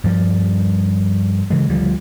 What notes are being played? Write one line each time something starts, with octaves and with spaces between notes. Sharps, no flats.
G2 F3 G3
C#3 E3 G#3
D2 D3 F3 G3